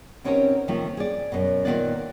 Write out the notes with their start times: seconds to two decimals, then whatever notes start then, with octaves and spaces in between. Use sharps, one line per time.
0.24 B2 C4 C#4 D#4 G4 A#4
0.68 C3 D#3 F3 A3 A#3
0.97 G#4 D5
1.32 F#2 B2
1.65 A#2 D3 D#3 A#3 B3 D5